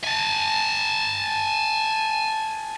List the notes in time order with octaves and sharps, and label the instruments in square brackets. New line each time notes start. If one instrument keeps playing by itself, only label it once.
[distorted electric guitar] G#5 A5